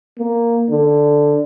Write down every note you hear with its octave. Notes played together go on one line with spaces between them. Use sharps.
A#3
D3